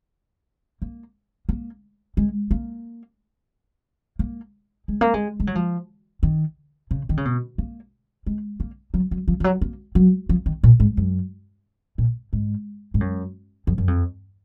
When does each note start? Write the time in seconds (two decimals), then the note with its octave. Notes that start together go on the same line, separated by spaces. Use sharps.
0.82 A#3
1.49 A#3
2.17 G#3
2.51 A#3
4.19 A#3
4.88 G#3
5.01 A#3
5.14 G#3
5.40 G#3
5.47 F#3
5.55 F3
6.23 D#3
6.91 C#3
7.09 D#3
7.17 C#3
7.25 B2
7.58 A#3
8.26 G#3
8.60 A#3
8.94 F#3
9.11 F#3
9.28 F3
9.40 F3
9.44 F#3
9.61 A#3
9.95 F#3
10.29 F3
10.46 D#3
10.63 A#2
10.80 G#2
10.97 F#2
11.98 A#2
12.33 G#2
12.94 G#2
13.01 F#2
13.67 F2
13.78 F#2
13.88 F2